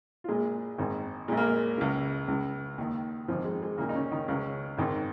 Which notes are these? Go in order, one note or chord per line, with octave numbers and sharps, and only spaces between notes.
F4
A#1 A#2 G#3 G#4
G#1 G#2 D#3
A#1 A#2 G#3
A#3
G#3
C#2 C#3
C#2 C#3
D#2 D#3
G#1 G#2 D#3 F3
G#3
G#3
D#2 A#2 C#3 A#3
D#4
C#3 C#4
D#3 D#4
C#2 C#3 C#4
G#1 G#2 D#3